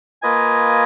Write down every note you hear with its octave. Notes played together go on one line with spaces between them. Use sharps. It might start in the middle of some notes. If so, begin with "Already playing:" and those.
A#3 F4 B4 D#5 G#5